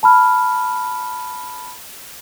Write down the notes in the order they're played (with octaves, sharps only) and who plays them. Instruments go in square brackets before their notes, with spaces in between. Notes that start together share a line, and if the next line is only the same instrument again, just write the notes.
[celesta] A5 B5 F6